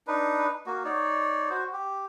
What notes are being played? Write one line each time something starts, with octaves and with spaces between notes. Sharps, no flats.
D4 D#4 B4
A#3 F#4
D#4 C#5 D5
F#4 C5
G4